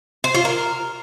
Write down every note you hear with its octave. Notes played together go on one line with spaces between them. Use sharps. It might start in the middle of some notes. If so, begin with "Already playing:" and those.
C5
F4
A#4